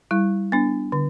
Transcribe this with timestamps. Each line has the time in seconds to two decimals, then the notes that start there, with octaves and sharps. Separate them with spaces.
0.11 G3 E4
0.52 B3 D4
0.92 D3